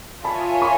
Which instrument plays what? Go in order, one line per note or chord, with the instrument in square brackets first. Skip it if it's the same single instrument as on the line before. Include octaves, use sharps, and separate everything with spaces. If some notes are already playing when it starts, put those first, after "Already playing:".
[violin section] F4 A#4 C#5 E5 G#5 [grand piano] A5 B5
[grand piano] B5 C#6